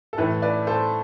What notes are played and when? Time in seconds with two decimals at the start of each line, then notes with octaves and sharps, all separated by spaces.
0.13 A4
0.18 A2 E3 A3 E4 B4
0.42 B4 D5
0.67 A4 C5